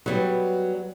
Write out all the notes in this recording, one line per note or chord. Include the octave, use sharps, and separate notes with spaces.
F#3 G3 B3